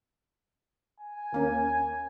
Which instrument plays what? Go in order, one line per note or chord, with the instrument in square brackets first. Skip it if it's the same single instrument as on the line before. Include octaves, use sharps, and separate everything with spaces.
[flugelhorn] G#5
[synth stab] D#2 A#3 C#4